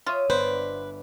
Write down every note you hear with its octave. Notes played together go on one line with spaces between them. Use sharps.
F4 C#5 E5 D#6
G1 B3 B4 C5 D5